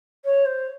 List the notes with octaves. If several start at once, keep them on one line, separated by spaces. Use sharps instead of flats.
C#5
C5